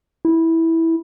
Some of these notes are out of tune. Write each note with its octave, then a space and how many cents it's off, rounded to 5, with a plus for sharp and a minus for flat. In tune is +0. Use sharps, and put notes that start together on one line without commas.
E4 -10